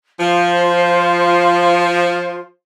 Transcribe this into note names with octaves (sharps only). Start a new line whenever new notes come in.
F3 F4 C5